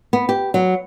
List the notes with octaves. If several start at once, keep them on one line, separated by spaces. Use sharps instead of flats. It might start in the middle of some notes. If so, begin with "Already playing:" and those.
B3
G4
F#3